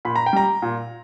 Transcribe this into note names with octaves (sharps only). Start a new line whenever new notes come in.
A#2 B5
A#5
G5
G3 A#5
A#2